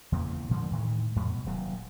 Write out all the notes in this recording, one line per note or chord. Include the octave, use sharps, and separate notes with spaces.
E2 A#2 C#3 E3
A#2 D3 F3 G#3
A2 D#3 E3 G#3
F2 A2 F3 G3
B2
D#1 D#2 C3 F#3